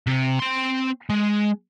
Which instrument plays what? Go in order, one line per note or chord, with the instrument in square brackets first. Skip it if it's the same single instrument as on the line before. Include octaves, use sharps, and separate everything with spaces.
[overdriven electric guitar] C3
C4 C6
G#3